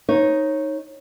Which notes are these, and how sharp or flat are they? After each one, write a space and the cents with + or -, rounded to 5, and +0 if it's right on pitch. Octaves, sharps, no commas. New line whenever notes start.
D#4 +0 C#5 -20